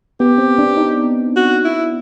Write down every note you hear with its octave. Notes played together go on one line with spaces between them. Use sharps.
B3 G4
C4
D4
D#4
F#4
E4